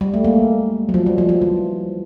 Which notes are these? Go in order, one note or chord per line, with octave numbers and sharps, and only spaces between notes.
G3
A3
G#3 A#3
F#3
F3
G3
F3
F3
E3